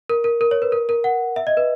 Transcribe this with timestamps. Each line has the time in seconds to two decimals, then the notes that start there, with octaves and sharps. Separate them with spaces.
0.10 A#4
0.24 A#4
0.41 A#4
0.51 C#5
0.62 B4
0.72 A#4
0.89 A#4
1.04 F#5
1.36 E5
1.47 D#5
1.57 B4